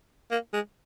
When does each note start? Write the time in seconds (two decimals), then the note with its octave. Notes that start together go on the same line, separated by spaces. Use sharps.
0.31 A#3
0.53 G#3